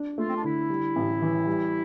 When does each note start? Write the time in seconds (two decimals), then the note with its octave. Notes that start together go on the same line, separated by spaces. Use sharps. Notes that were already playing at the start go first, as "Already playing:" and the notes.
Already playing: D4
0.18 A3 F4
0.28 C4
0.35 D4
0.44 D3 E4
0.69 G3
0.96 A1
1.22 E3
1.47 G3